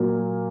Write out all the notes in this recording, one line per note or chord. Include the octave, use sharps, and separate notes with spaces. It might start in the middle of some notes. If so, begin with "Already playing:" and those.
Already playing: A#2 F#3 A#3